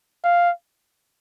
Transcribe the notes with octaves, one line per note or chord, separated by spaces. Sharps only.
F5